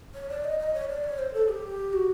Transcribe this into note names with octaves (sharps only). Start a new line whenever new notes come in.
C#5
D5
D#5
D#5
C#5
D5
C#5
C5
A4
G4
F#4